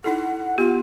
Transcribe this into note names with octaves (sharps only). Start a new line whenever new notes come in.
D#4 E4 A4 F#5
B3 F4 G4